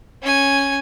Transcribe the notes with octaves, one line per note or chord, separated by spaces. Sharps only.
C#4 G#5